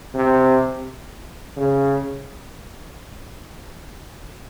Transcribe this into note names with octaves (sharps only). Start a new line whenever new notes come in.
C3
C#3